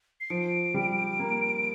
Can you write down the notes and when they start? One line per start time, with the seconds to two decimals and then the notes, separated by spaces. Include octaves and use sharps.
0.20 C7
0.30 F3 D7
0.74 G3
1.19 A#3